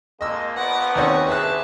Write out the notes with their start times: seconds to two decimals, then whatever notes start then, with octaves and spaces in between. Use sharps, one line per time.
0.21 F2 G#3 A#3 D#5 E6
0.56 A#1 B3 B4 F#5 D6
0.96 D#2 C4 C#4 F#4 C#6
1.28 C2 G#4 E5 A5 F#6